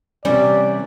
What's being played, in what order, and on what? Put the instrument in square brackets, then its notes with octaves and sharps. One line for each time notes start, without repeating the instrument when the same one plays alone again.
[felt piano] C3 C#4 [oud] E3 G3 [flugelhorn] D5